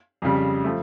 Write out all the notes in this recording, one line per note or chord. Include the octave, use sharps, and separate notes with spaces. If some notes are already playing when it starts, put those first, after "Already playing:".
F2 C#3 G3
F3 A3